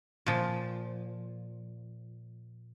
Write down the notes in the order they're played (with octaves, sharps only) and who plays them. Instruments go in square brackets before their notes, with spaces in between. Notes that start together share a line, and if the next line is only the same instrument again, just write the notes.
[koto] A#2 F3